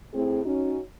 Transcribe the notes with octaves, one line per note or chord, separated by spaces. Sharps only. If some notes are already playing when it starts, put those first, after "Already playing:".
A2 C4 G#4
C#4 D#4 F#4